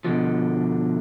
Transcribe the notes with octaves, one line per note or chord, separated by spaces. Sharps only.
B2 D3 F3